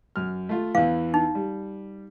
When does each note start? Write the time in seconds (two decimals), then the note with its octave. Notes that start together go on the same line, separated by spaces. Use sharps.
0.16 F#2 F6
0.49 A3 F4
0.75 E2 E3 F5
1.14 D#4
1.35 G3